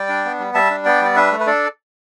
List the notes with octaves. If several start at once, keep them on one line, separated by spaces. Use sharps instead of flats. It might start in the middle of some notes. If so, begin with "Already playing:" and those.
Already playing: G3 D5 G5
D4
B3
G3
G3 E5 A5
D4
B3 D5 G5
G3 D5
D4 B4 E5
A3
B4
D4 A4 D5